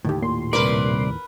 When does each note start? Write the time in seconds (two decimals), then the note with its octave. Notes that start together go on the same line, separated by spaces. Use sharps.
0.05 D#2 A2 D3 D#3 G4
0.22 A#2 C6
0.53 C2 F#2 A#4 B4 D5